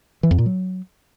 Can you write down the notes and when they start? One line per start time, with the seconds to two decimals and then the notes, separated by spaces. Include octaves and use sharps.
0.23 E3
0.31 F2
0.38 A#2
0.46 F#3